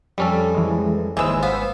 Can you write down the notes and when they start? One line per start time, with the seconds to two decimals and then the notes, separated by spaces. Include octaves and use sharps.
0.18 F2 G3 C#4 A4
0.54 E3 G#3
1.17 G#1 D#2 E3 G#3 C5 E6
1.43 B3 F5